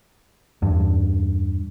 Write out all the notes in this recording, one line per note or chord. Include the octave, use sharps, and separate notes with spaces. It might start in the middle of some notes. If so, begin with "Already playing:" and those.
E2 G2